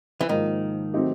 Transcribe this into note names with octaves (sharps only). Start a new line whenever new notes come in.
E3
G#2 D#3 F3 A#3
F#3 A3 C4 D#4 G4